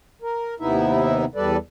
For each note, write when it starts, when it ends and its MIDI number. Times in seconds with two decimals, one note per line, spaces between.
0.22 0.54 70
0.60 1.25 39
0.60 1.25 48
0.60 1.25 59
0.60 1.25 63
0.60 1.25 64
0.60 1.25 76
1.35 1.57 40
1.35 1.57 55
1.35 1.57 69
1.35 1.57 71
1.35 1.57 74